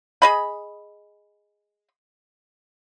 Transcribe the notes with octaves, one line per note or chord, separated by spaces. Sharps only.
G#4 D#5 B5